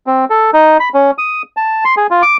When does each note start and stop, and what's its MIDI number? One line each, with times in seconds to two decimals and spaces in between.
0.07 0.25 60
0.30 0.51 69
0.53 0.77 63
0.80 0.89 83
0.94 1.11 61
1.18 1.42 87
1.57 1.84 81
1.85 1.95 84
1.97 2.07 68
2.11 2.22 65
2.22 2.37 86